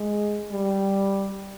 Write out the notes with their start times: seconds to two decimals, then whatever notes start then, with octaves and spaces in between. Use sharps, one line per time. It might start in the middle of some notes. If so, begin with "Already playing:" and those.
Already playing: G#3
0.52 G3